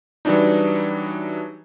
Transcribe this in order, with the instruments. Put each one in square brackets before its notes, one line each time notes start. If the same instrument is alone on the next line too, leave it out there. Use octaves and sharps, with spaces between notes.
[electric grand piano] E3 F#3 G3 D4 D#4